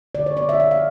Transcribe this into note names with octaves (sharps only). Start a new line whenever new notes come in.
D3 D5
C#5
B3 D5
E5
F3 E5
F5